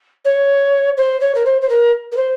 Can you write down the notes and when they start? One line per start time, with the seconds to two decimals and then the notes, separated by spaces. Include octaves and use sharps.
0.24 C#5
0.97 C5
1.20 C#5
1.34 A#4
1.45 C5
1.61 C5
1.69 A#4
2.11 A#4
2.16 C5